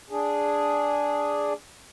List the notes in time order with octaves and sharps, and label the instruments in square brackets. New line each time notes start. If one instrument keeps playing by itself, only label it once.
[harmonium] D4 G#4